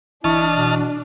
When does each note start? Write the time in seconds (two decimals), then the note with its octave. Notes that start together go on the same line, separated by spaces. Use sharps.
0.24 G1 E3 D4 E4 D#5 A5 C#6 F6
0.55 B2